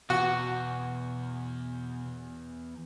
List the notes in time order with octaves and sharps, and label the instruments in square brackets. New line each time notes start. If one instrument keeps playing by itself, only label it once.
[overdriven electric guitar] E2 [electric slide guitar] B2 G#5 [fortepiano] F#4